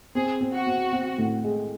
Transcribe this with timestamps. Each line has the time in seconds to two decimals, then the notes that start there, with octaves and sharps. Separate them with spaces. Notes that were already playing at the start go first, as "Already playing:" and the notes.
0.15 C4 G#4
0.41 C4
0.54 F#4
0.67 C4
0.93 C4
1.18 A2
1.44 G#3